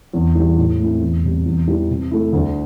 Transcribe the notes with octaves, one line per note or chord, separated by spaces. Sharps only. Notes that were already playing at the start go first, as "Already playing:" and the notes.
E2
E3 G3
A2
A3 C4 E4
E2
C3 G3
E2
E3 G3
C3
A3 E4
D2